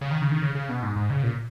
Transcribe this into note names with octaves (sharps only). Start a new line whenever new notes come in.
C#3
D#3
C#3
D#3
C#3
C#3
B2
G#2
G#2
C#3
A#2